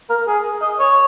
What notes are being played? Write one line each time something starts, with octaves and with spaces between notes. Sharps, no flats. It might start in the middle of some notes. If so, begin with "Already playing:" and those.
A#4
G#4
D#5
C#5